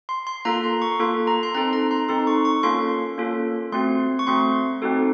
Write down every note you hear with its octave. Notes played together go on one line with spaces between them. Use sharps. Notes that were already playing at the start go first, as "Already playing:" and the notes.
C6
C6
A#3 F4 A4 A#5
C6
C#6
A#3 F4 A4 C6
A#5
C6
C4 D#4 A4 A#5
A#5
C6
C4 D#4 A4 C6
C#6
C#6
A#3 C#4 F4 A4 C6
A#3 C#4 F4 A4
A3 C4 F#4 C6
C#6
A3 C4 F#4 C6
C4 D#4 F#4 A4